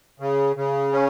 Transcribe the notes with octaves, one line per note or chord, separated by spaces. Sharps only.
C#3
C#3
C#4